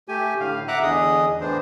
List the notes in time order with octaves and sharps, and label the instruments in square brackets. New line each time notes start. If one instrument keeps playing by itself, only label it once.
[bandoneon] A3 G4 G#5
A2 D3 F5
E5 F#5 A#5 D6 F#6
E2 D3 G#4 D#5 D#6
A2 E3 D4 C5